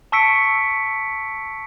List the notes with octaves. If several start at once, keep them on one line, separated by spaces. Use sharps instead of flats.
A5 C#6 E6 B6 C#7 D7